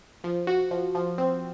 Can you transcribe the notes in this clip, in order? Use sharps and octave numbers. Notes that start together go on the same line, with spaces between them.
F3
F#4
F3
F3
C4